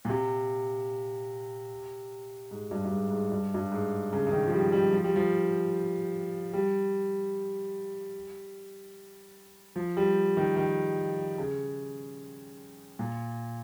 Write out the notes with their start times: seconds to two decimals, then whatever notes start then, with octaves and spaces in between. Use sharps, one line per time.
0.05 A#2
0.09 C3
2.51 G#2
2.71 G2
2.85 G2
2.92 G#2
3.11 G#2
3.32 G2
3.54 G2
3.72 G#2
4.13 C#3
4.27 C#3
4.32 D#3
4.47 F3
4.53 G3
4.72 G3
4.93 F3
5.04 G3
5.16 F3
6.53 G3
9.76 F3
9.97 G3
10.37 D#3
10.56 D#3
11.38 C#3
12.99 A#2